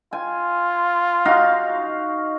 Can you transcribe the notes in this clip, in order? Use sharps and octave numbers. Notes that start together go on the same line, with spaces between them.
F4 G#5
D#4 F#4 F5